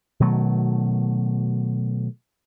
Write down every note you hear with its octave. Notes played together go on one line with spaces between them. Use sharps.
B2 D#3 F#3 A3